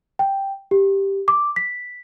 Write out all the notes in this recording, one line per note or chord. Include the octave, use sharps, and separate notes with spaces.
G5
G4
D6
B6